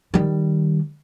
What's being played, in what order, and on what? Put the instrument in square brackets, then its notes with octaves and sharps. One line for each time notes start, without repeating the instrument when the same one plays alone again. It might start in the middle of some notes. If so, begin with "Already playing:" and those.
[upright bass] D#3 G3